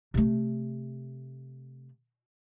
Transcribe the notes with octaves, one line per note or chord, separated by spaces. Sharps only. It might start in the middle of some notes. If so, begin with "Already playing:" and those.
C3 A3